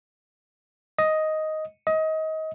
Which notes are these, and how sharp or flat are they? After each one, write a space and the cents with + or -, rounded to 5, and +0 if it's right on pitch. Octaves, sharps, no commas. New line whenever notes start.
D#5 +5
D#5 +25